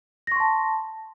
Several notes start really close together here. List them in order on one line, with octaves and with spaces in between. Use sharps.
A#6 C#6 C6 A5